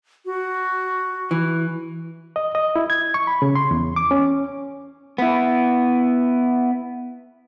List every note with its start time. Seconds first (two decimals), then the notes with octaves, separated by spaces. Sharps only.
0.26 F#4
1.31 E3
2.36 D#5
2.55 D#5
2.76 E4
2.90 G#6
3.14 C#6
3.27 B5
3.42 C#3
3.55 C6
3.71 E2
3.96 D6
4.11 C#4
5.18 B3 E4